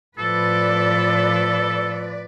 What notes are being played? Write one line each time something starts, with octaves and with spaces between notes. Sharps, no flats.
A2 F3 A4 B4 D5